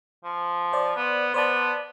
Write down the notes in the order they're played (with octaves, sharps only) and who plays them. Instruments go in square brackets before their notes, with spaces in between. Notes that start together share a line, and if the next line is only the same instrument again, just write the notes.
[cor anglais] F3
[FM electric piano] C5 D5
[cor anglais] B3
[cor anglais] B3 [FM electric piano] C5 D5 A5